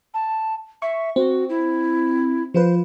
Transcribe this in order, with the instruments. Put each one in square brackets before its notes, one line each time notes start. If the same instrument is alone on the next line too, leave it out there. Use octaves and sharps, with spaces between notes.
[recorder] A5
[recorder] E5 [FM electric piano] C#6
[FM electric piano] C4 [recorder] F#4
[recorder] E4
[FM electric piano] F3 F4 B4 [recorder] C5